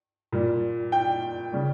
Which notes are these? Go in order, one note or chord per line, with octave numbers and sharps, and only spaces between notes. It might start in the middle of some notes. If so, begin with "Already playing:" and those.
A#2 G3
G5
C#3 G3